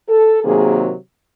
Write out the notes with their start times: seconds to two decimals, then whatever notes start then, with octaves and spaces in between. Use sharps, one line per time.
0.09 A4
0.44 C3 D#3 F#3 A#3 G#4